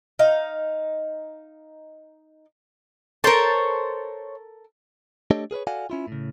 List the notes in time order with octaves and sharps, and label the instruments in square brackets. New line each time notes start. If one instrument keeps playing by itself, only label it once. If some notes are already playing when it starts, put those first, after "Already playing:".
[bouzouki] D#4 F5
[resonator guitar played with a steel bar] A4 A#4 [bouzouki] C5 C#5 A5
[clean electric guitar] A3 D4 G4 A4 C#5 D#5
G#4 A#4 B4 C#5
F#4 A4 D5 F5 F#5 G#5
C#4 E4 F4
A2 C#3